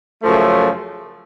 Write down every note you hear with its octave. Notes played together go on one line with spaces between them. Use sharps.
F#2 C#3 F3 A3